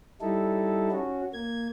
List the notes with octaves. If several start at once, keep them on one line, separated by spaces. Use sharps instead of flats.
G3 D#4 E4 A4
C#4 F#4
A#3 G#6